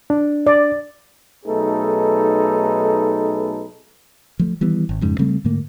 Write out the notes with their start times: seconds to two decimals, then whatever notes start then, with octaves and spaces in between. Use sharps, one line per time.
0.10 D4
0.47 D5
1.46 B1 A3 D#4 G#4 A4 B4
4.39 F3 A3
4.61 D#3 E3 G3 B3
4.89 G#1
5.01 F2 G#2 C#3
5.19 C#3 G3 A3 C4
5.45 G#2 D3 A3 A#3